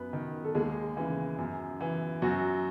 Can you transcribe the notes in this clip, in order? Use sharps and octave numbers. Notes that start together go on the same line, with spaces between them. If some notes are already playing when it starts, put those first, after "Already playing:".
Already playing: F#2 B3 B4
D#3
A4
D#2 G#3 G#4
C#3 E3
F#2
E3
F#2 F#3 F#4